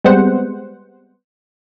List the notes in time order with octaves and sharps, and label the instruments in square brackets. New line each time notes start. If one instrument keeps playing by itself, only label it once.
[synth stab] G3 G#3 B3 C4 C5 F#5